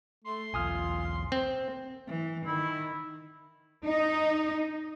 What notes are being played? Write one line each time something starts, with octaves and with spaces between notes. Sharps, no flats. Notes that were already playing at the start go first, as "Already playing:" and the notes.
A3 C6
B1 E2 F4 G#5 D#6 F6
C4
E3
D#3 E4
D#4